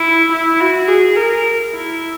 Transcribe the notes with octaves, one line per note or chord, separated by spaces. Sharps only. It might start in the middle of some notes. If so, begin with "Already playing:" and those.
Already playing: E4
E4
F#4
G#4
A#4
E4